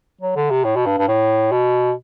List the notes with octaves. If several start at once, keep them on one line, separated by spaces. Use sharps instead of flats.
F#3
D3
C3
A2
B2
G2
G2
A2
B2